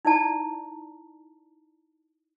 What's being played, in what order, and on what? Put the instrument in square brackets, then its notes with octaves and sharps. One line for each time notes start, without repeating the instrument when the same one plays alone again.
[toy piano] D#4 E4 D5 A5 A#5